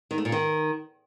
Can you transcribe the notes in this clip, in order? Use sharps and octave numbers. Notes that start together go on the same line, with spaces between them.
D#3
A3
A#2
D#3